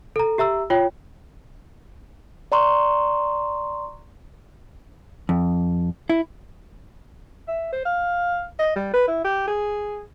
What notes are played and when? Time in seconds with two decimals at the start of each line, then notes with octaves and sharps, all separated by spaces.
0.16 A4 A#5
0.38 G4 E5 A#5 E6
0.70 F4 C#5 G5
2.52 D5 A#5 C6 C#6
5.29 F2
6.10 E4
7.48 E5
7.73 C5
7.85 F5
8.59 D#5
8.76 G3
8.94 B4
9.07 E4
9.25 G4
9.48 G#4